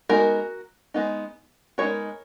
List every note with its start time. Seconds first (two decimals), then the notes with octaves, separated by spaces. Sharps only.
0.09 G#3 B3 D#4 F#4 A#4
0.94 G#3 B3 D#4
1.78 G#3 B3 D#4 A#4 C#5